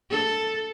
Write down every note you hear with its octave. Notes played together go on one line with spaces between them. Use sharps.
A4